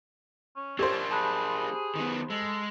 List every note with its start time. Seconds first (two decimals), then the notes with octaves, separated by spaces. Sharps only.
0.56 C#4
0.79 A#3 C#4 D4 G4 C5 E6 G#6 A6
1.11 G#4 A5 B5 F#6
1.95 D#3 B3
2.30 G#3 A4